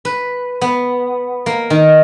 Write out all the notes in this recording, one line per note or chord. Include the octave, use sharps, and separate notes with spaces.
B4
B3
A#3
D#3